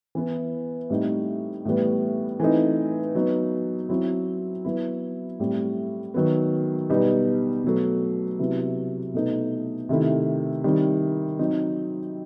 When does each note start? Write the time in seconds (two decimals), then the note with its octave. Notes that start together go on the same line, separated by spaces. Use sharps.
0.15 E3 B3 E4
0.90 A2 G3 C4 D#4
1.65 A2 E3 G3 B3
2.40 E3 A3 C4 D#4
3.15 F#3 B3 D#4
3.89 F#3 C4 E4
4.65 F#3 B3 E4
5.40 A2 G3 C4
6.14 D#3 F#3 B3
6.90 B2 G3 B3 D#4
7.64 B2 F#3 A3
8.39 C3 F#3 B3 E4
9.14 B2 A3 D#4
9.89 C3 D#3 A3 E4
10.64 D#3 G3 C4
11.39 F#3 C4 D#4